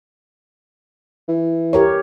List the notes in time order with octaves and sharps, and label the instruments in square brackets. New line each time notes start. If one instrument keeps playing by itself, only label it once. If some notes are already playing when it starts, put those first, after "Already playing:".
[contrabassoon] E3
[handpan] G4 A#4 C#5